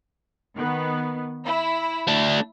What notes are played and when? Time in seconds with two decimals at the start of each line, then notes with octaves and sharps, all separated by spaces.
0.55 D#3 B3
1.45 E4
2.07 A3 D4